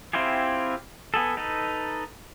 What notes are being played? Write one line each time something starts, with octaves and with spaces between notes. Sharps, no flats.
C4 E4 F4 G4 G#4
B3 G#4 A4
D#4 A4 B4